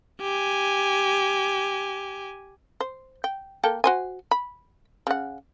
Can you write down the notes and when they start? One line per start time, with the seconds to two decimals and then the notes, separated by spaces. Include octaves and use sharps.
0.21 G4 G#5
2.80 C5
3.24 G5
3.63 A#3 A4 G5
3.84 F#4 C5 G#5
4.31 B5
5.07 C#3 F#5